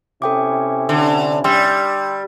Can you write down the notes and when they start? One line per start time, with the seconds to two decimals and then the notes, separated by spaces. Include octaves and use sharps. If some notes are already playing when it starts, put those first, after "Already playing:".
0.22 C3 C#4 E4 A4 G5 D6
0.89 D3
1.44 G3 G5 C6 E6